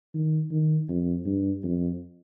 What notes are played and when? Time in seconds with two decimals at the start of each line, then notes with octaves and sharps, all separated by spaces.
0.15 D#3
0.51 D#3
0.89 F2
1.26 G2
1.64 F2